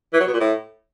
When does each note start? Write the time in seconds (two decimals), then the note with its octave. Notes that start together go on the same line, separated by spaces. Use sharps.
0.14 E3
0.20 F#3
0.27 B2
0.34 A#2
0.40 A2